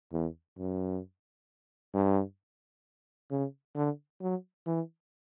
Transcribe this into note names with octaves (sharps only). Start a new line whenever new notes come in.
E2
F#2
G2
C#3
D3
F#3
E3